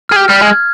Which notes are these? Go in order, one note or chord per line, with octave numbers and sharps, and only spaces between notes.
G#4 F6
G4
G3 F6
G#3
G#6